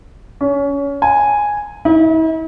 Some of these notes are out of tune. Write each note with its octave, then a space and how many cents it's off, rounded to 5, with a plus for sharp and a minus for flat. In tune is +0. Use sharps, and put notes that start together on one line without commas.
C#4 +25
G#5 -5
E4 -45